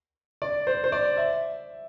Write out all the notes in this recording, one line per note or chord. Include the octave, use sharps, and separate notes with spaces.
D5
C5
C5
D5
E5